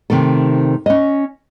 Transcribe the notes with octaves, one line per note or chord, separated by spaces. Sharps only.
C3 D#3 A3 A4
C#4 D#5